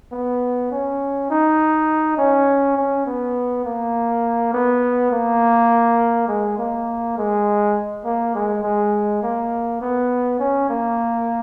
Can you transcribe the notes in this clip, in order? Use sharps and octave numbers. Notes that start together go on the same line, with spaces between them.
B3
C#4
D#4
C#4
C#4
B3
A#3
B3
A#3
G#3
A#3
G#3
A#3
G#3
G#3
A#3
B3
C#4
A#3